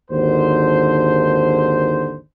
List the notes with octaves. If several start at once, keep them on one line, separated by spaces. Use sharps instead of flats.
G#1 D#2 D3 D#3 C5